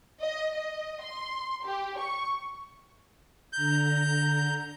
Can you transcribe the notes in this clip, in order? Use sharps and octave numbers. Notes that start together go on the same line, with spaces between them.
D#5
D#5
C6
G4
C#6
D3 A#5 G6